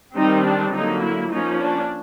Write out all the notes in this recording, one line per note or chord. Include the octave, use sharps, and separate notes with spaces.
D#3 G3 C4 D#4
D4
D3 F#3 A#3 D#4
E4
F3 A#3 C#4 D#4
D4